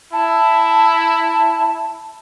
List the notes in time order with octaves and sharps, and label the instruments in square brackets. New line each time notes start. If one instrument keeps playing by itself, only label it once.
[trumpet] E4 [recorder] A5